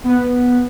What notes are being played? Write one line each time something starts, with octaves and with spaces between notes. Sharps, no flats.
B3